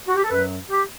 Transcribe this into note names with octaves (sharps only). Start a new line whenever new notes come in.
F#4
G4
A4
F#2 F#3 B4
G4